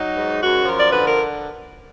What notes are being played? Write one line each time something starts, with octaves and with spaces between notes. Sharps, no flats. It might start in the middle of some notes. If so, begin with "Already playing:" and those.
Already playing: F#3 D#4
G#2
F#2 F#4
F3 A#4
D5
D3 B4
A#4